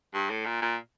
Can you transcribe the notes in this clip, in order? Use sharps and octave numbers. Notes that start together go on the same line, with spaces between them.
G2
A2
A#2
A#2